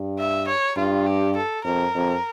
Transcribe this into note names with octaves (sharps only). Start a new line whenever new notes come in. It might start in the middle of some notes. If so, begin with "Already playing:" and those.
Already playing: G2
E5
C#5
G2 F4
G4
A4
F2 A#4
F2